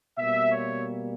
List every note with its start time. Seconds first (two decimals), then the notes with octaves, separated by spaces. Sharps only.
0.18 B2 G3 A#3 E5
0.52 C#5